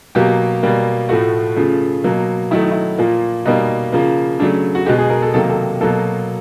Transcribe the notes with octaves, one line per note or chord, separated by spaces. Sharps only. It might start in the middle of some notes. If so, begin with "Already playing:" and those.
B2 F#3 A#3 G4
B2 G3 A#3
A2 F3 A3 F#4
C#3 F3 A3
B2 F#3 A#3
D#3 F#3 A3 E4
D#4
E4
A#2 F3 A#3
B2 G3 A#3 D#4
C#3 F3 A#3
C#3 F#3 A3 D4
F#4
B2 G#3 G4
G#4
A#4
A4
C3 D#3 F#3 A#3 A4
A4
B2 F#3 A#3 A4